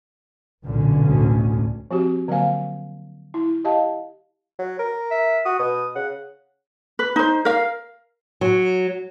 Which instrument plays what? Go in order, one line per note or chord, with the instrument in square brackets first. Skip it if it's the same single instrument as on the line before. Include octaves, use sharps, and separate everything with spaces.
[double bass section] B1 D3 C#4 [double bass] A#2
[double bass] A1 D2
[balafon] F3 C4 F#4 G4
D3 F#3 A#3 C5 F5 G#5
E4
G4 D#5 F5 A5
[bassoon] F#3
A#4
[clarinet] E5
[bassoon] F#4 [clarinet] D#6
[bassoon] B2 [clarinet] D#6
[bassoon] C#3 [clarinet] F#5
[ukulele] B4
D#4 C5
A#4 F5
[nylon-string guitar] F#3